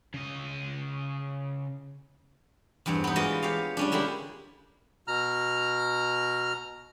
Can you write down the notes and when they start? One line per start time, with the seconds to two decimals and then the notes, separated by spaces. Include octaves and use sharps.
0.14 C#3 D#5
2.86 E2 G2 C4 C#5
3.04 B3 D#4
3.16 E3 G#3 F4 F#4 D5 D#5
3.43 G4 C#5 F5
3.77 G3 C#4 D4
3.92 D3 G#3 A#3 E4 G4
5.08 B2 A#5 F6